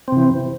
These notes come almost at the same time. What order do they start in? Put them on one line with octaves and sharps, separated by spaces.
C4 C3 E3